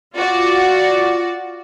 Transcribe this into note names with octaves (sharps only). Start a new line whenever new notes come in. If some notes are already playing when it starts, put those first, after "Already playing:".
F4 F#4 D5